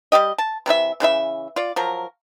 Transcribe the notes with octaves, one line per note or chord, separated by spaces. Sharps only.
G3 A#3 G4 D#5
A5
C3 E3 D4 E5
C#3 E3 E4 E5
F4 D5
F3 F#3 A#4